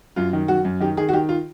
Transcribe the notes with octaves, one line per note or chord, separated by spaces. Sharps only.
F#2 F4
D#3
F#2 F#4
F#2
D#3 G4
D#3 G#4
F#4
D#3 G4
F4